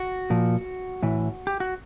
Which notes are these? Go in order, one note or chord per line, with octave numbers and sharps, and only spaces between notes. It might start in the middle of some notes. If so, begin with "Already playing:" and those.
Already playing: F#4
A#2 F3
A2 E3
G4
F#4